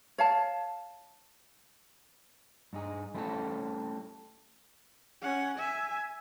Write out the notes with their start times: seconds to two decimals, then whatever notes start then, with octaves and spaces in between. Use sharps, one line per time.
0.18 C#5 F5 A5
2.73 G2 D#4 G#4
3.14 G3 A3 C4 C#4 E4 A4
5.21 C#4 F#5
5.58 E5 G#5